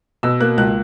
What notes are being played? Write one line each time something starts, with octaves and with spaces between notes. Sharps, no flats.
B2 E6
A#3 F#6
C#2 F#6